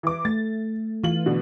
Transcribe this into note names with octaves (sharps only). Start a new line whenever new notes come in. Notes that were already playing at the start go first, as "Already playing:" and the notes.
E3 D6
A3 A6
E3 F4 F#7
B2 D3 F#4